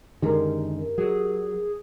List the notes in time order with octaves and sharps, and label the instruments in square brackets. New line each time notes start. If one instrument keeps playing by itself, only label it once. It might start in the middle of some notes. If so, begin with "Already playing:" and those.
[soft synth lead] F#2 [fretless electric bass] D3 D#3 G#3 [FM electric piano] G4 A#4
[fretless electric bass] F#3 [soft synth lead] G#4